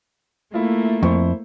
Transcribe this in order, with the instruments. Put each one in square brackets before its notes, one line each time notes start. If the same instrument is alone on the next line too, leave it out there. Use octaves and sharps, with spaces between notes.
[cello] A3 A#3 [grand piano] E4 F4
[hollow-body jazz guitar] F2 [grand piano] E4 C5 C#6